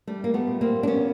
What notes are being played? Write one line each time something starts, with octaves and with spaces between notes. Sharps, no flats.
G3 A3
A#3
A3 B3
A#2
A#3 C4
D4
E2 B3 C#4